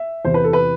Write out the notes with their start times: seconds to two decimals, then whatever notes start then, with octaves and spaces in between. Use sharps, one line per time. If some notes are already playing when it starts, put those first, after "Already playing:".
Already playing: E5
0.25 E2 C3 E3 C5
0.34 B4
0.44 A4
0.53 B4